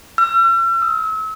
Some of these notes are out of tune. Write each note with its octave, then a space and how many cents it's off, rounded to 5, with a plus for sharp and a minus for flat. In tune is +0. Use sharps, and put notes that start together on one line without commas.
E6 +45
E6 -35